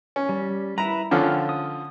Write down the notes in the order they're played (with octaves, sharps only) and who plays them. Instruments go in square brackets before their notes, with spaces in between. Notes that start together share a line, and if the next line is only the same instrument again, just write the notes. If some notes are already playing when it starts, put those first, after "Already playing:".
[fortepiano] C#4
[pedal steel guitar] G3
[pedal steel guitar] E4 B4 [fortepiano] A#5
[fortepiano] D3 F3 C#4 [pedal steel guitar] G5 F6
[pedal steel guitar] D#6